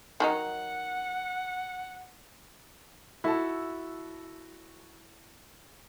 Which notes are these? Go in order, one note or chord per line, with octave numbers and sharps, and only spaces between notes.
D#3 F#3 D#4 F#5
E4 F#4 A4 A5